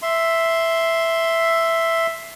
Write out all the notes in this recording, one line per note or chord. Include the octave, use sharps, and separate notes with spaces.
E5 C6